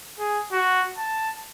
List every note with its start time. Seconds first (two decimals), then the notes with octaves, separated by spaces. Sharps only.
0.19 G#4
0.52 F#4
0.98 A5